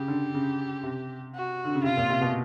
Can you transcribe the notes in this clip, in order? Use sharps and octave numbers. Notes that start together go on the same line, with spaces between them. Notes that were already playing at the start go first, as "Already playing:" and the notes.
Already playing: C#3 G4
D3
C#3
C3
F#4
D3
C#3
C3 F4
A#2
C3
B2